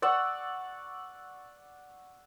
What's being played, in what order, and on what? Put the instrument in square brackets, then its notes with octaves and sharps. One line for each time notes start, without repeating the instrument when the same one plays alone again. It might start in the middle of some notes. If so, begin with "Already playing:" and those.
[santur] D5 F#5 C#6 E6